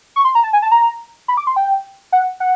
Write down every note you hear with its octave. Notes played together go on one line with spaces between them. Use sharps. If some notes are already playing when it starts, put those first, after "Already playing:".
C#6
C6
A#5
A5
G#5
A5
A#5
B5
D6
C6
G5
F#5
F#5